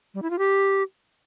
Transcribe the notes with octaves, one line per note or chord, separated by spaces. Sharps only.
G3
E4
F4
G4